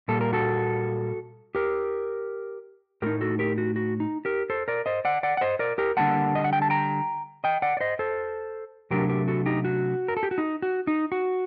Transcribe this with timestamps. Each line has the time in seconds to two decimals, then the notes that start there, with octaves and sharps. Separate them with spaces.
0.08 A#2 G3 A#3 A4
0.21 A#4
0.33 F#4 A4
1.55 G4 A#4
3.02 A2 A3 D#4 G4 A#4
3.21 F#4 A4
3.39 G4 A#4
3.58 F#4
3.76 F#4
4.00 D#4
4.25 G4 A#4
4.50 A4 C5
4.68 A#4 D5
4.86 C5 D#5
5.05 D5 F#5
5.23 D5 F#5
5.37 F#5
5.41 C5 D#5
5.59 A#4 D5
5.78 G4 A#4
5.97 D3 G3 A#3 F#5 A5
6.35 D#5
6.44 F#5
6.53 G5
6.62 A5
6.70 G5 A#5
7.44 D#5 G5
7.62 D5 F#5
7.77 D5
7.81 C5 D#5
7.99 A4 C5
8.91 C3 F#3 A3 D4 G4 A#4
9.09 G4 A#4
9.28 F#4 A4
9.46 D#4 G4
9.65 F#4
10.08 A#4
10.17 A4
10.23 G4
10.31 F#4
10.38 D#4
10.62 F#4
10.87 D#4
11.12 F#4